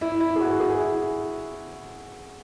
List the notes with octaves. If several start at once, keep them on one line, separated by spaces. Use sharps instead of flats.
E4
E4
G#4
F#4
G#4
E4